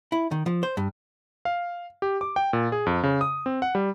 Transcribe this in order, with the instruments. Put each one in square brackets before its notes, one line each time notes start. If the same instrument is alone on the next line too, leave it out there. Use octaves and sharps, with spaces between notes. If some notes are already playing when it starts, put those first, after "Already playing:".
[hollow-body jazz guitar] E4
D#3
F3
C5
G2
[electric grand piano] F5
G4
D6
G5
A#2
G#4
F2
C#3
D#6
C4
F#5
G3